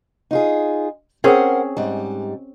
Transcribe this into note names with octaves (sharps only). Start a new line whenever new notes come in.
D#4 F4 G#4
C4 C#4 G#4 A#4 C5 F#5
G#2 G3